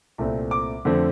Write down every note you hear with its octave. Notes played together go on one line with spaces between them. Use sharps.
C2 A#2 A3 C4
D6
F2 D3 A3 C4